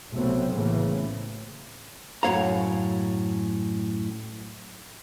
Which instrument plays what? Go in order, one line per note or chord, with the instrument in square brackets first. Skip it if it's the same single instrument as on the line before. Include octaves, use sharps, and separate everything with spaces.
[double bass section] B1 C3 F#3 A3 B3 C4
A2 C#3 E3 A3 A#3
[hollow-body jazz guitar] F#2 A2 A#3 C#5 F5 A#5